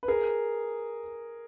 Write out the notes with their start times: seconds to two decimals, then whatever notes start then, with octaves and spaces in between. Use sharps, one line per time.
0.03 B4
0.08 G#4 A#4